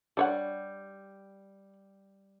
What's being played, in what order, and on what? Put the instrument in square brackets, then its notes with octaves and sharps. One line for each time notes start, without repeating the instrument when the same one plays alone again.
[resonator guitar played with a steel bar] G3 [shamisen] D4 C#5 F#5